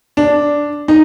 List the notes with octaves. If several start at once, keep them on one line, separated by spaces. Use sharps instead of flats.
D4
D#4